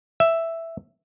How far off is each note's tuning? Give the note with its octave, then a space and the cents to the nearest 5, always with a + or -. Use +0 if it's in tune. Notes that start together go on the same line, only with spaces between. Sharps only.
E5 +5